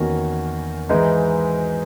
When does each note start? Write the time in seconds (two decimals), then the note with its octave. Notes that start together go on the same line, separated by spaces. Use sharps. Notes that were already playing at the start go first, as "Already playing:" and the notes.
Already playing: E2 D#3 A#3 C#4 F#4
0.89 G#2 E3 G#3 D#4 G#4